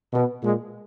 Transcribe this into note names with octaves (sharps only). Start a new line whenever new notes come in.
B2
A#2 G#3